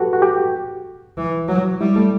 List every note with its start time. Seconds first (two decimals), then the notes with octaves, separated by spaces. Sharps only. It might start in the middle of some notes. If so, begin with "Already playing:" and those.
Already playing: F#4 G4 A4 B4
0.13 F#4
0.22 G4
1.17 E3
1.48 F#3
1.80 G3 E4
1.96 A3